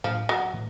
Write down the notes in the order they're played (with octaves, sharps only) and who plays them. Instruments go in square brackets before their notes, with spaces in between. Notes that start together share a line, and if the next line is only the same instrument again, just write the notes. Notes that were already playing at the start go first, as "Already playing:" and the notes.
[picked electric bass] A2 F#3 A#3 D4 [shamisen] F3
[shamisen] F#3
[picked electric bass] A2 E3 A3